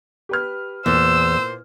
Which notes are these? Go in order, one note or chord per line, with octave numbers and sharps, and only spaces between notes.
G4 B4 F6
E2 A#2 C5 E6